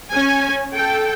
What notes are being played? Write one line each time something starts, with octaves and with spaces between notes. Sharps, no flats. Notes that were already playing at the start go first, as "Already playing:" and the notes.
C#4 G#5
A4 G5